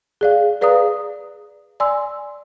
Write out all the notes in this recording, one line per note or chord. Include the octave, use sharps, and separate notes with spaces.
G#4 D5 F5
G#4 B4 D5 F5 A#5 D#6
D5 G#5 C6 E6